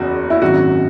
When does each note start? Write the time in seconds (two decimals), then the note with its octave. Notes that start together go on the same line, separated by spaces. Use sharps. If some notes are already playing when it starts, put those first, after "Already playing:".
Already playing: F#1 E2 C#3 F#4
0.30 E4
0.42 G#1 F#2 D#3 F#4